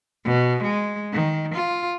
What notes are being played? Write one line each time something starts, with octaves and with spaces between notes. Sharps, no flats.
B2
G#3
D#3
F4